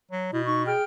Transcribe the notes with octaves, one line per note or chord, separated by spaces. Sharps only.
F#3
B2 E4
D#4 C#6
G#4 G5 F6